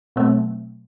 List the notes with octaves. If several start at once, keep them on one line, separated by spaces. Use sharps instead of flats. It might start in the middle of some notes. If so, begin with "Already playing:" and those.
B2 F#3 A3 C4